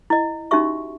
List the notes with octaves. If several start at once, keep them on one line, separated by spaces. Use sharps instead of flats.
E4 D#5
C#4 D#4 F#4 G4 E5 C#6